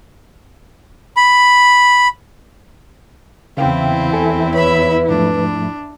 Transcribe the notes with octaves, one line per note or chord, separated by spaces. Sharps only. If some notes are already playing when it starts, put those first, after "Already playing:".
B5
E2 C#3 C4 E4 F5 G5
A4 G#5
B4 C#5 E5 B5
G#2 F3 A3 D4